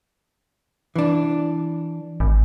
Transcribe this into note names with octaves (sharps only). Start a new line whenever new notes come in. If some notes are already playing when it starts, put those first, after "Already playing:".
E3 D4
G#1